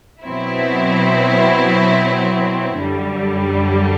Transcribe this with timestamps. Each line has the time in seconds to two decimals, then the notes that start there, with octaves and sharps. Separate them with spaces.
0.23 B2 F#3 C4 E4
2.79 F#2 D3 G3